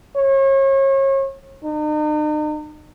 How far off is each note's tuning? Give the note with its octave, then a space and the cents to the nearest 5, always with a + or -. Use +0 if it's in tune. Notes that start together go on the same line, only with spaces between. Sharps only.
C#5 -35
D#4 -40